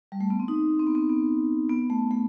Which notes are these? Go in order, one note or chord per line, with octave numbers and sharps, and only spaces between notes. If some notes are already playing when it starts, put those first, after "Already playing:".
G3
A3
B3
C4
D#4
C4
B3
C4
B3
B3
A3
A3